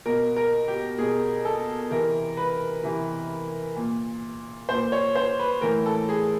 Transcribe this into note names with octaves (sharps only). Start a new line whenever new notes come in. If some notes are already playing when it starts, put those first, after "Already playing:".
B2 A#4
A#4
G4
B2 G#4
A4
C3 E3 A#4
B4
C3 E3
A#2
A#2 C5
C#5
C5
B4
A2 E3 A#4
A4
G#4